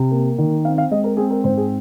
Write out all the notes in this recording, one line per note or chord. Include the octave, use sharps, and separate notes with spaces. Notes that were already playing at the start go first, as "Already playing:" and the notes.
Already playing: C3
A#3
D#3
C4 F5
F5
G#3 D#5
A#4
C4 G#4
A#4
G#2 C5
G#4